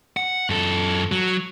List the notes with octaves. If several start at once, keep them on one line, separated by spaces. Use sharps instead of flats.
F#5
F#2 A4
F#3